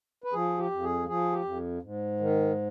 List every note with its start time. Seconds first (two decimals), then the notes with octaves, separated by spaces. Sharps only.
0.24 B4
0.33 F3 G#4
0.59 G4
0.71 F2
0.83 G#4
1.08 F3 G#4
1.32 G4
1.45 F2
1.82 G#2
2.20 D#3